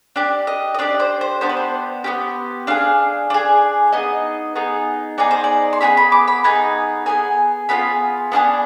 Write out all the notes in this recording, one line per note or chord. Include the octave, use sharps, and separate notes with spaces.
D4 G4 D5
D#5
D#5
D4 G4 D5
C5
C5
B3 D4 G4 C5
B4
C5
B3 D4 G4
D4 G#4 F5
D4 G#4
B3 D#4 G#4 D#5
B3 D#4 G#4
B3 D#4 G#4 D5
C5
D5
C6
B3 D#4 G#4 B5
B5
D6
B5
B3 D#4 G#4 G#5
B3 D#4 G#4 G#5
B3 D4 F4 G#4 B5
B3 D4 F4 G#4